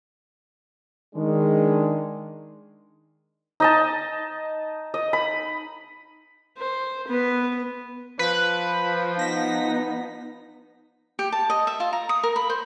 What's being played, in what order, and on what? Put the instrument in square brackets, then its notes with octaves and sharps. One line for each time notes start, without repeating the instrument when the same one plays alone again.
[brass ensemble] D#3 G#3 D4
[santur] D#4 D#5 A5
D#5
B5
[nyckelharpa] C5
B3 B4
[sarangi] F3 [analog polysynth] B4
[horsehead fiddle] B3 D#4 [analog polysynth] A#6 B6
[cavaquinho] G4
A5
D#5
E5
F4
A#5
D#6
A#4
B5
C5